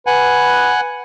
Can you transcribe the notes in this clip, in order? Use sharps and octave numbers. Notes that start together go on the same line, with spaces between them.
B4 F#5 G#5